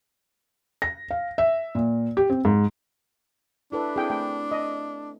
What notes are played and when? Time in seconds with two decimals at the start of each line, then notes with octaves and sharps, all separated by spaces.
0.82 A#6
1.11 F5
1.38 E5
1.75 A#2
2.17 G4
2.30 C4
2.45 G#2
3.72 D4 E4 A4 B4
3.96 C4 E4 G#4 G5
4.10 A3 G5
4.51 D#5